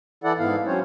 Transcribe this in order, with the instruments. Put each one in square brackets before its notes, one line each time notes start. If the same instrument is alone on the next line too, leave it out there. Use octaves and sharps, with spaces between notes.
[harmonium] E3 E4 A4 D5 F#5
G#2 B3 E4 F5
F#3 C4 C#4 C5 C#5